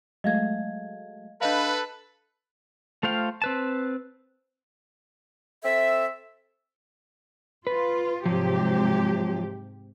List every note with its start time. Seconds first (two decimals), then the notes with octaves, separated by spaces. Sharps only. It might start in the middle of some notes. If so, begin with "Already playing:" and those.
0.24 F#3 G#3 A3 D#5 F5 G#6
1.41 D4 A4 B4 D#5 F5
3.03 A3 F4 C5 F5 G5
3.42 C4 B4 A5
5.64 C4 A4 E5
7.67 F4 B4
8.26 G#2 C3 F3 F#3 G4